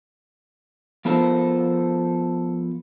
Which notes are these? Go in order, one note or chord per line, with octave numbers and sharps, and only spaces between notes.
F3 B3 F4 A4 A#4 C5